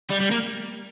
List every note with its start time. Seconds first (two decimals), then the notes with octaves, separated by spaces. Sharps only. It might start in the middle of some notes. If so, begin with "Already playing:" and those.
0.10 G3
0.20 G3
0.31 A#3